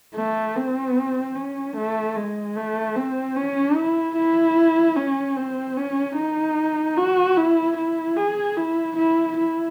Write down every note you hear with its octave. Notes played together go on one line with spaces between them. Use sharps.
A3
C4
C#4
A3
G#3
A3
C4
C#4
E4
E4
C#4
C4
C#4
D#4
F#4
E4
E4
G#4
E4
E4
E4